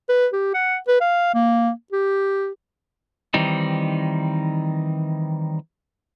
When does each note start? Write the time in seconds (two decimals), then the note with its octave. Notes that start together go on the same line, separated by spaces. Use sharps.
0.09 B4
0.33 G4
0.54 F#5
0.88 B4
1.01 F5
1.34 A#3
1.93 G4
3.34 D#3 E3 G3 C4 D#4